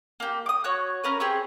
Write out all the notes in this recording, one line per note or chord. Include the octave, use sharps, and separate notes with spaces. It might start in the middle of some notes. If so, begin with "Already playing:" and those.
A#3 G4
D6 D#6
F#4 C#5 F#6
C#4 A#4 B4
C4 G4 G#4 C#6